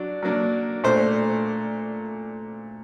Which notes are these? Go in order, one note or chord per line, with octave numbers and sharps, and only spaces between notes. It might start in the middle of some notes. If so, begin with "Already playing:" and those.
Already playing: F#3 D4
F#3 A#3 D4
A#2 A3 D4 C5